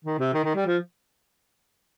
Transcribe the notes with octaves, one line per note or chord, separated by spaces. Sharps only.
D#3
C3
D#3
D#3
G3
F3